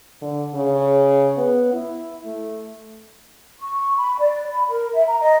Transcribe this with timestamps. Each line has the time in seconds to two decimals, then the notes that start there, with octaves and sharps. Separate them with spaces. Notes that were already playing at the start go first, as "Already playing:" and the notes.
0.22 D3
0.54 C#3
1.37 B3
1.74 E4
2.25 A3
3.61 C#6
3.97 B5
4.19 D5
4.50 B5
4.69 A#4
4.95 E5
5.08 A#5
5.21 D#5